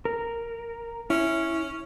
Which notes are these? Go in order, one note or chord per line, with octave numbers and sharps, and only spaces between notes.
A#4
C#4 E4